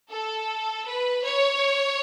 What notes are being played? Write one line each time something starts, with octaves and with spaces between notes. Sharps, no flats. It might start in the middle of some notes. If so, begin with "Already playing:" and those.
A4
B4
C#5